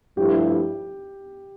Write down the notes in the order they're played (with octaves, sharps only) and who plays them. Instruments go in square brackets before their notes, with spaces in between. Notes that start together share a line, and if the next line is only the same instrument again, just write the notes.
[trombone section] G2 F3 A3 E4 [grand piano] G4